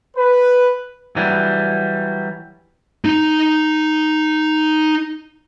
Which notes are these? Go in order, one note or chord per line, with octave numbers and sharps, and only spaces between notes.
B4
E3 F#3 G3
D#4 A#5